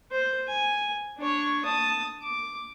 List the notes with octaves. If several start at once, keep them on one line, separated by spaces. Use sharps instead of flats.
C5
G#5
D4 C#5
A5 D#6
D6